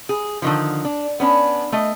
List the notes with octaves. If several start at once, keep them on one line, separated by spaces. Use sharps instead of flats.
G#4
D3 D#3 F3
D4
B3 C#4 D4
A3 D#5